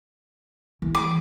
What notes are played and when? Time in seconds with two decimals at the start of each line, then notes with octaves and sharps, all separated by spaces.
0.82 E3
0.95 D6